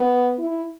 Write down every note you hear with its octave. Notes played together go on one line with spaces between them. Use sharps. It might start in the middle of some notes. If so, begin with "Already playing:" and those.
Already playing: B3
E4